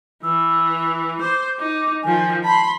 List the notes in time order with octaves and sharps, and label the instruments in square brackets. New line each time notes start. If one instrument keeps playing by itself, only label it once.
[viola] E3 [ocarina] E6
[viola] C5 [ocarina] D6
[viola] D#4 [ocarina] D6
[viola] D#3 F3 [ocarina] G#5
[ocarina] A5 [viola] B5 C6